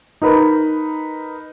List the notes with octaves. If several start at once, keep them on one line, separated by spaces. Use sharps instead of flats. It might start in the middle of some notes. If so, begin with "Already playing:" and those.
D#4 A#4 B4 B5